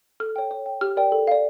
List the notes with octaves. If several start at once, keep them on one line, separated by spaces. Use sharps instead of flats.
A4 F6
C#5 G5
C#5
G5
G4 F6
A#4 D5 G5
A4
D5 F5